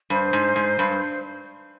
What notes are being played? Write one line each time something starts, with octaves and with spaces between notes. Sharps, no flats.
G2 C5
G#2
G#2
G2